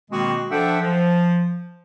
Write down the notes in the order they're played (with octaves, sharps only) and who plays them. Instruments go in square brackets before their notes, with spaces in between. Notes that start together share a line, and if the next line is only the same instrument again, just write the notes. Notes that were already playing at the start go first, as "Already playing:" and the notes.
[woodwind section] B2 D#3 G#3 A#3 C4 F#4
F3 D4 A4 E5 F#5 G5
F3